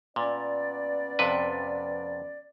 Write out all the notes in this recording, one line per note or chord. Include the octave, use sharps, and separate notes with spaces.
A#2 B3 C#4 D5
F2 C3 B4